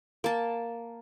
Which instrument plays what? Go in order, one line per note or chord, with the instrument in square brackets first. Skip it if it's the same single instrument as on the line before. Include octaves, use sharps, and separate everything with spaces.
[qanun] A#3 A5